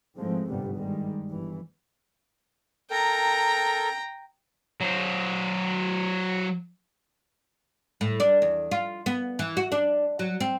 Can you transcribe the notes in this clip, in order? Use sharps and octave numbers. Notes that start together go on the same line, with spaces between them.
G#2 E3 F3 G#3 A3 C4
G1 G#2 C3 G3 B3
D#3 G3 G#3
G1 E3
A4 A#4 G5 A#5
F#3 C5
A2
D4
E2
F4
B3
E3
F#4
D4
F#3
C4